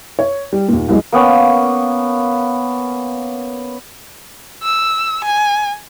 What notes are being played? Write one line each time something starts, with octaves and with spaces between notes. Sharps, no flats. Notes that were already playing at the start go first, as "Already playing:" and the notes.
C#5
G3
D#2 A#2
C2 F#2 G#3
A#3 B3 C#4 G5
E6
G#5